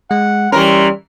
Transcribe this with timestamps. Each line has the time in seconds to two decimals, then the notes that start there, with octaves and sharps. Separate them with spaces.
0.11 G#3 F#5
0.52 E3 G3 C#4 G4 A#4 C#5 C6